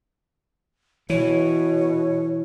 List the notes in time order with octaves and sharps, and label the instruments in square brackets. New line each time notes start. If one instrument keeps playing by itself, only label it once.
[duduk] B2 [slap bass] E3 [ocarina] C#5